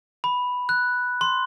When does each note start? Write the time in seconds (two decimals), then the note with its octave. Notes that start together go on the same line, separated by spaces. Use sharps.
0.24 B5
0.69 F#6
1.21 C6